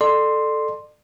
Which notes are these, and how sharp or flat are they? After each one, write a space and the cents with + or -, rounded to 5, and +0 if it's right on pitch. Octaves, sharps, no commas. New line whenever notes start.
A4 +0 D5 +30 C6 +0